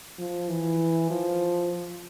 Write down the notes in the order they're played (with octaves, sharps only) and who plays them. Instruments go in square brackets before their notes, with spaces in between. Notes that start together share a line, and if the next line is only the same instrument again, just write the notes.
[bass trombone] F3
E3
F3